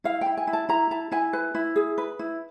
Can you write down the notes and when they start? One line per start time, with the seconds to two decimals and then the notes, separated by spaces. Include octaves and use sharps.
0.04 E4 F5
0.21 E4 G5
0.37 G#5
0.47 E4
0.53 A5
0.69 E4 A#5
0.91 E4 A5
1.12 E4 G#5
1.33 B4
1.55 E4
1.76 G#4
1.98 B4
2.19 E4